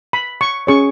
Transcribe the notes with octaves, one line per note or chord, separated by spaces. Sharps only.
B5
C#6
C#4 G#4 C#5 C#6